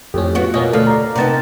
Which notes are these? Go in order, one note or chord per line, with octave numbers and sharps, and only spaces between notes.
F2 A2 C#4 G4
B3 F4 F#4
B2 A#3 C#4 D#5
D2 A4 B4 D5 F5
A#5
C3 B3 D#4 A#4 A5